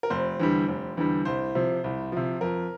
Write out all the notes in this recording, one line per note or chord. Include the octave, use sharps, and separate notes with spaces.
A#4
F1 C5
E2 D3 G3
F1
E2 D3 G3
C2 C5
C3 F3
C2
C3 F3
F2 A#4